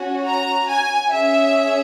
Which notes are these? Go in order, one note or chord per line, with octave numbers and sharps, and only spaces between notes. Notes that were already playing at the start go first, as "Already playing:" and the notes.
Already playing: C#4 F#4
A#5
G#5
C#4 G#4 E5